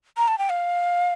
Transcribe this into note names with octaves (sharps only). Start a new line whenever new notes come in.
A#5
A5
G5
F5